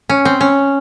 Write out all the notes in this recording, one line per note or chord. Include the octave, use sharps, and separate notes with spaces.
C#4
C4
C#4